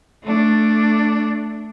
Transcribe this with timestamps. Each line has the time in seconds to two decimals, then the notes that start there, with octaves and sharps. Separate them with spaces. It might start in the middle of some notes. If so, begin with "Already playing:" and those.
0.23 A3 D4